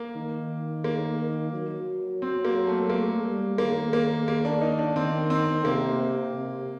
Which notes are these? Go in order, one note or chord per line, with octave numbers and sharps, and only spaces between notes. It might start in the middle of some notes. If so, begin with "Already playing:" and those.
Already playing: A#3
D#3
A#3
F#3
C4
A#3
A3
A3 A#3
G3
D#3 A#3
A#3
A#3
D4
D#4
D4
D#3 C4
C4
C3 A#3
C3